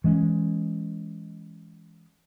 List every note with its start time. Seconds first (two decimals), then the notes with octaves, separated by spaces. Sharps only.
0.04 E3 G#3 A#3 C#4